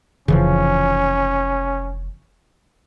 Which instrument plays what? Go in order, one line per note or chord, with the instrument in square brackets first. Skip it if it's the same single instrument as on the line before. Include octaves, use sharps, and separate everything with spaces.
[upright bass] F1 D#4 [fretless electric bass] C#3 E3 F3 [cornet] C#4